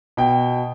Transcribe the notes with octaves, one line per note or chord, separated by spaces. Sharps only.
B2 G5